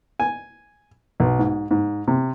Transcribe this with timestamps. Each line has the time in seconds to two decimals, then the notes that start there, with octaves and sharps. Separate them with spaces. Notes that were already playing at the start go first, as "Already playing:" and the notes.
0.20 G#5
1.20 B1
1.39 G#2
1.71 G#2
2.08 C3